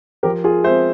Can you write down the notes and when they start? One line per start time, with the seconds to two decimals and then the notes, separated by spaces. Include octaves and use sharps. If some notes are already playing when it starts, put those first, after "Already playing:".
0.23 F3 G4 A#4
0.44 F4 G#4
0.64 G#3 C4 C5 E5